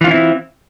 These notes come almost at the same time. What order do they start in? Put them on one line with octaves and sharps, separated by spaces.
E3 F4 C#4 E4 C4